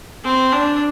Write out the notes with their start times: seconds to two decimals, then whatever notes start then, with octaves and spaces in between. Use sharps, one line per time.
0.24 C4
0.52 D4